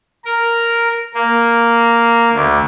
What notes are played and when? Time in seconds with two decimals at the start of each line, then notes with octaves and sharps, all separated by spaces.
0.25 A#4
1.14 A#3
2.33 D2